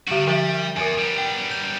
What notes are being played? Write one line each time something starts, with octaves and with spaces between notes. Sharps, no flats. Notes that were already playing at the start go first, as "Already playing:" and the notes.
D3 G3 F#4 F#7
F3 G3 E5
E2 A#4 G#5
G3 B3
G5
G6